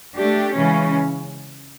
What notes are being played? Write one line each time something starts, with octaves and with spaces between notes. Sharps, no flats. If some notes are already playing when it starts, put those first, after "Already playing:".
A3 D4 G4
C#3 E3 G#3 C#4